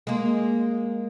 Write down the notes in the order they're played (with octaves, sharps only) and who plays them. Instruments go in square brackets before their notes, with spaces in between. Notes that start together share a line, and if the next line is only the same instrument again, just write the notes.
[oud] G#3 A#3